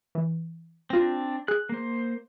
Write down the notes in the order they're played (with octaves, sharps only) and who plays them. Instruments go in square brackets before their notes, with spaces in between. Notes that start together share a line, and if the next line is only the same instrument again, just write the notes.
[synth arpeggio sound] E3
[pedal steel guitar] C4 D4 [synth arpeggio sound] F4 A#6
[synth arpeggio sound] G#4 [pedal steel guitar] F#6
[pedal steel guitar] A#3 C5